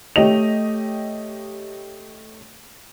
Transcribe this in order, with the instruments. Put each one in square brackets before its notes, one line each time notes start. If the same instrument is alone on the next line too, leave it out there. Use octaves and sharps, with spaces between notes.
[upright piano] A3 G4 C#5 D#5 F7